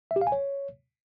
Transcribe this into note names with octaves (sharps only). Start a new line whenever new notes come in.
E5
G4
F5
G#5
C#5